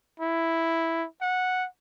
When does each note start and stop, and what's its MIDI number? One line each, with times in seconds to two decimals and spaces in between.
0.20 1.06 64
1.22 1.67 78